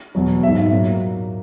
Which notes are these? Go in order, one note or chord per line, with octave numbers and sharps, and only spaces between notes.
E2 B2 F#3
G#2 F#3 E5
A#2 F#3